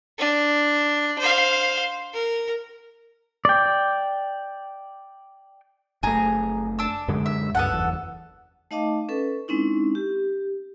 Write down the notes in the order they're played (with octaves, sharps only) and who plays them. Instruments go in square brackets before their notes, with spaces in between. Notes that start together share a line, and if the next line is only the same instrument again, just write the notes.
[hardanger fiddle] D4
C5 F5
A#4
[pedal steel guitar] D5 G5
[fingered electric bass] F#1 A3 [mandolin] G#4 A#5
[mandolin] D4 E6
[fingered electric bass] F#2 D3 G#3
[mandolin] E5
[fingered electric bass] C#2 G2 [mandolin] B3 A4 F#5
[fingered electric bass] F#1 E2
[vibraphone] A3 D#4 D#5 F5 A5 D6
C#4 A4 B4
G#3 C4 C#4 D#4 E4
G4